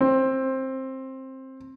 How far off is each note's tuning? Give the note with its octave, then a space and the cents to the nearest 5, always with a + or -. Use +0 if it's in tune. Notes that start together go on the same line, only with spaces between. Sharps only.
C4 +15